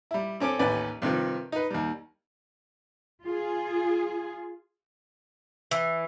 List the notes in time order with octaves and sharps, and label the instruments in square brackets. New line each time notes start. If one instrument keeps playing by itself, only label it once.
[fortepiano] G3 E4
C4 C#4 A4 D6
A1 D#2 C#4 B4 D5
G2 C3 D#3 F3
D#4 B4
D#2 G3
[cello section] F4 G#4
[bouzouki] E3